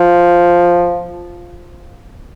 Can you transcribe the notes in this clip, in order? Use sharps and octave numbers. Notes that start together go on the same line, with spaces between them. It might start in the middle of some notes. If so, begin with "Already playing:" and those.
Already playing: F3